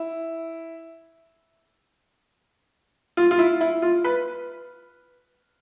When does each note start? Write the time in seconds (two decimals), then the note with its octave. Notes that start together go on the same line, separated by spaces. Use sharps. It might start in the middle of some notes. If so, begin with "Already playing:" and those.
Already playing: E4
3.17 F4
3.31 F4
3.39 E4
3.61 E4
3.82 F4
4.04 B4